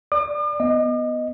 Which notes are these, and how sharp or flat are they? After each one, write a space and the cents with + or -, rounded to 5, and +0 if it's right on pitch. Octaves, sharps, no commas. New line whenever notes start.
D5 +0 D6 +45
B3 +0 D#5 +0